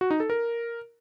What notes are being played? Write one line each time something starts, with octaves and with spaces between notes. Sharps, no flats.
F#4
D#4
A4
A#4